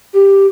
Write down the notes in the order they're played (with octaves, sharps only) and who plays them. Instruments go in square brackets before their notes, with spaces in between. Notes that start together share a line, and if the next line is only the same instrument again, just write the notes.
[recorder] G4